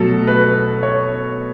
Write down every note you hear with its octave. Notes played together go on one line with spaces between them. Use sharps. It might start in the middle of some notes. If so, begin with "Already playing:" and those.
Already playing: B2 F#3 A3 A4
B4
C#5